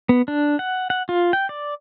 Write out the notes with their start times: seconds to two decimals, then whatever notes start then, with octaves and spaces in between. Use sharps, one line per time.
0.09 B3
0.28 D4
0.59 F#5
0.90 F#5
1.09 F4
1.33 G5
1.49 D5